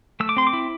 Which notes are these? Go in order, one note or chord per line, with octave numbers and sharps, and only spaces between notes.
A3 E6
D6
C4 C6
D6
E4